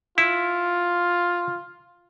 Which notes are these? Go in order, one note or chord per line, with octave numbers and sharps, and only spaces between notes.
E4 F4